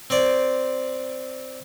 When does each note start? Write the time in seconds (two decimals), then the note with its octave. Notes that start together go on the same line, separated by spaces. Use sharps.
0.10 C4 C5 D5